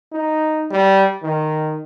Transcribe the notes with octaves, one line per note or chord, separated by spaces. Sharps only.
D#4
G3
D#3